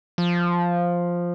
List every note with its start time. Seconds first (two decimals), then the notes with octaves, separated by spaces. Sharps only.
0.18 F3